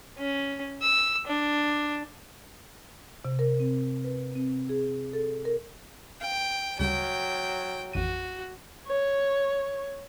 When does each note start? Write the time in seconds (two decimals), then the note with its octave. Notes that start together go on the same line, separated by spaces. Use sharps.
0.18 C#4
0.82 E6
1.27 D4
3.25 C3
3.39 A#4
3.60 C4
4.04 B4
4.36 C4
4.69 G#4
5.13 A4
5.45 A#4
6.21 F5 G5
6.80 D2 C#3 F#3 G3 G5
7.93 A1 F2 F#4 D#7
8.87 C#5